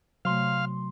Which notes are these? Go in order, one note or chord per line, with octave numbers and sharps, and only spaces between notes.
C3 F#3 A3 F5 C6